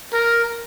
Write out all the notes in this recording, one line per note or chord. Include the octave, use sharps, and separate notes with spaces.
A#4